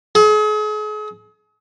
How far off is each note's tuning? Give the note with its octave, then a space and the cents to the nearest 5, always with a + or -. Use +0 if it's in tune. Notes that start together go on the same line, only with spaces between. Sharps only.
G#4 +40